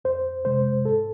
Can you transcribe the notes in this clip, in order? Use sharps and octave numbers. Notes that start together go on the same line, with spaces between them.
F2 C5
C3 G#3 C5
G#2 A4